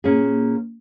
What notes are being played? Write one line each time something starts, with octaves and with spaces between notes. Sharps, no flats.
A#2 A#3 C#4 G#4